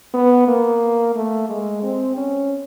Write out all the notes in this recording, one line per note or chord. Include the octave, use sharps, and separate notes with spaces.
B3
A#3
A3
G#3
C4
C#4